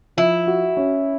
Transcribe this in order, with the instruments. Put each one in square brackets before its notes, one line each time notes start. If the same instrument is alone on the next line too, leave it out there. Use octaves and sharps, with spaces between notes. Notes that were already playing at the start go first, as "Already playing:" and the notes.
[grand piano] F3 [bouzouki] E4
[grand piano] F#4
C#4